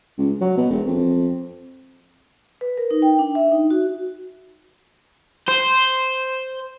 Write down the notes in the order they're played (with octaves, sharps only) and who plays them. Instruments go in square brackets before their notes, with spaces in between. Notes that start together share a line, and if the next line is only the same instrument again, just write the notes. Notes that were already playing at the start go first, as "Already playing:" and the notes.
[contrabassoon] C#2
F#3
B2
E1
F2
[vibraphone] B4
A#4
D#4
G5
D4
E5
D#4
F#4
[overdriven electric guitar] C5